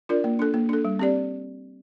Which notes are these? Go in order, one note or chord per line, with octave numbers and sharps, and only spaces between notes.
D4 F4 A#4 D5
A#3
D4 A4
A#3
D4 A4
G3
C4 G4 D5